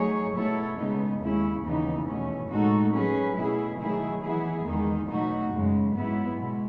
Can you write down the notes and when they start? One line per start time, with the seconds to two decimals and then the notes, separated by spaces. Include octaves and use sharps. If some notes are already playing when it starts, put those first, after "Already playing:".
Already playing: F#3 A3 D#4 G#4 C#5
0.35 B2 A3 E4 A4 C#5
0.78 C#3 G#3 B3 D#4
1.21 D#2 C#3 G#3 C#4 E4
1.64 D#2 C#3 E3 B3 D#4
2.07 E2 B2 A3 C#4
2.50 A2 G#3 D#4 F#4 A4
2.93 F#3 C#4 G#4 B4
3.36 B2 A3 E4 G#4
3.79 D#3 F#3 A3 E4 G#4
4.22 E3 B3 E4 G#4
4.66 E2 D#3 G#3 D#4
5.08 B2 F#3 A3 D#4 F#4
5.51 F#2 C#3 G#3
5.94 G#2 F#3 B3 E4
6.38 B2 G#3